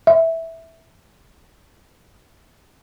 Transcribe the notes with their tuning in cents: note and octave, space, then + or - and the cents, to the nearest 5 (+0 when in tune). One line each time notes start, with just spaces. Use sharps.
E5 -10